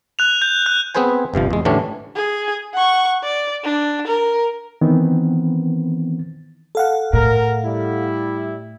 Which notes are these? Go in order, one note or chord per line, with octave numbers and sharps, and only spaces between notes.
F#6 F7
G6
F#6 G6
B3 C4 G#4 B4 C5 G#5
G1 G2 C3 F3
E2 G#3
A2 D3 E3 G3 C#4 D4
G#4
F#5 C#6
D5
D4
A#4
D#3 E3 B3 C4
A4 F5 F#5
A2 A#4
G3 E4